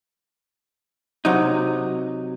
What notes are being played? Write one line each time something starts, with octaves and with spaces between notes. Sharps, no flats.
C3 F#3 D#4